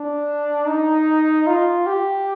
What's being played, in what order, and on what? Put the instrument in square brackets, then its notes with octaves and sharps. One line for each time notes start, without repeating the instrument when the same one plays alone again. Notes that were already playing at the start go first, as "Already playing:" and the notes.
Already playing: [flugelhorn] D4
D#4
F4
G4